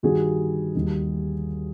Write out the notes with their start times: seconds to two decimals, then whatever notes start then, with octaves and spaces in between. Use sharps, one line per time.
0.03 G2 D#3 G3 F#4 G#4
0.75 D#2 D#3 G3